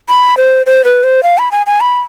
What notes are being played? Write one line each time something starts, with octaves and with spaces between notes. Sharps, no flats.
B5
C5
C5
B4
C5
F5
B5
G#5
G#5
B5